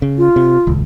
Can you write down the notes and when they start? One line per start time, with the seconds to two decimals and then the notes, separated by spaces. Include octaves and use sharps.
0.02 C#3
0.18 F4
0.36 C3
0.67 D#1 C#2